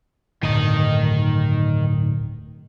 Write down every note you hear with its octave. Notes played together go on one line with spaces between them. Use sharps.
D1 G2 D#3 D#5